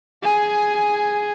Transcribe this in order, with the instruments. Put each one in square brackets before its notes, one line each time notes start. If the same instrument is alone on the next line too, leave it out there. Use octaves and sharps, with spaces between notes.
[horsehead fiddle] G#4 G#5